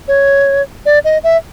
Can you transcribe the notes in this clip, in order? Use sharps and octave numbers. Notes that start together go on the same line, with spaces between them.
C#5
D5
D#5
E5